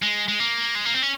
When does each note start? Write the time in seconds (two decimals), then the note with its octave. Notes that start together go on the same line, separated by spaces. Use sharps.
0.02 G#3
0.28 G#3
0.40 A#3
0.75 G#3
0.85 A#3
0.94 C4
1.02 C#4